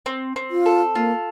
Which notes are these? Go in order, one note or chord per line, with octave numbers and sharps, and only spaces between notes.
C4
C4
F4
A4
A#3 F4